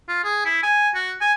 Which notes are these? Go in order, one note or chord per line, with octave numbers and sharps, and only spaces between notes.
F4
G#4
E4
G#5
F#4
G#5